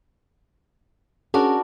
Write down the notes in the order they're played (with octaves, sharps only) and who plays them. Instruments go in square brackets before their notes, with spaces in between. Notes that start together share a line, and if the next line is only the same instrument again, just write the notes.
[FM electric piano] C#4 G#4 [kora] D4 F#4 A#4